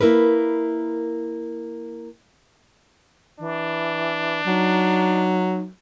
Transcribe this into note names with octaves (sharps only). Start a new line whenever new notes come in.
A#3 E4 A#4 B4
E3 D4
F#3 D#4